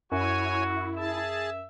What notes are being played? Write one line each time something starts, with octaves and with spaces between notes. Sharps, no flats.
F#2 E4 F#4 C#5 G#5
G#4 E5 A5